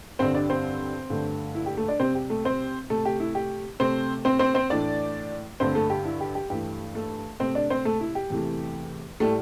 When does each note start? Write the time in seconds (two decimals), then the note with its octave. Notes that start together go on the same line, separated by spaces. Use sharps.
0.19 G2 D3 G3 C4 C5
0.35 D4 D5
0.50 C4 C5
1.10 G2 D3 A3
1.55 E4
1.66 G4
1.77 A3 A4
1.88 D4 D5
2.00 C3 G3 C4 C5
2.15 G4
2.30 A3 A4
2.45 C4 C5
2.90 C3 A3 A4
3.05 G4
3.20 E4
3.35 G4
3.80 C3 A3 C4 C5
4.25 C4 C5
4.39 C4 C5
4.55 C4 C5
4.70 A2 E3 A3 D4 D5
5.60 G2 D3 A3 C4 C5
5.75 A3 A4
5.90 G4
6.05 E4
6.21 G4
6.35 G4
6.50 G2 E3 A3 G4
6.95 A3 A4
7.40 C3 A3 C4 C5
7.55 D4 D5
7.70 C4 C5
7.85 A3 A4
8.01 E4
8.15 G4
8.30 E2 C3 E3 A3
9.20 A2 G3 A3 A4